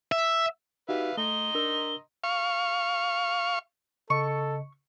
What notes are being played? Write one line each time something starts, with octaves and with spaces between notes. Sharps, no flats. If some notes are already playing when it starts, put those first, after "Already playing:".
E5
D#4 F#4 G4 B4 E5 F5
A3 D#5 A#5 C6 G7
D4 A#4 E6
F5 C#6
C#3 A4 D#5 C#6